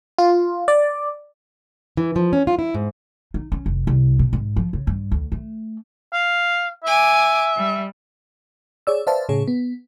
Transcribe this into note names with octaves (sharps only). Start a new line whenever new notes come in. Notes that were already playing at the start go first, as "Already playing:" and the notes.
F4
D5
E3
F3
C#4
F4
E4
G#2
D#4
C#4
F1
C2
B2
G#2
F3
C#3
G2
D2
A3
F5
E5 G#5 D6
G3
G#4 C#5 D5 E6
B4 C5 D5 E5 F5 A5
A2 C#3 G#4 C#5
B3